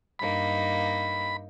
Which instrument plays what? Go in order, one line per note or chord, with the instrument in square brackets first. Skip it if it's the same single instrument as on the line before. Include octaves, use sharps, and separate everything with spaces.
[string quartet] G2 A#3 D#4 [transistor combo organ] B5